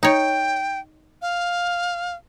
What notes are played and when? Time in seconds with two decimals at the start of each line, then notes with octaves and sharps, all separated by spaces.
0.03 D#4 C#5 G5
1.22 F5